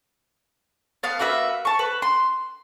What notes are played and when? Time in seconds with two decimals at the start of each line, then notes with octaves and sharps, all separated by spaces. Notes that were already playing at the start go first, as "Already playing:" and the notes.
1.03 B3 F5 A5
1.19 A#3 F#4 B4 E5
1.65 A5 C#6
1.79 B4
2.02 C6